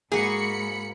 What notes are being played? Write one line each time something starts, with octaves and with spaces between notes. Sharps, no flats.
G#2 A#3 F#4 G#4 B5 C#7